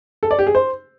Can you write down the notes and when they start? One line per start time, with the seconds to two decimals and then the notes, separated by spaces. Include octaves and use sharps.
0.23 A4
0.31 D5
0.39 G4
0.47 G#4
0.55 C5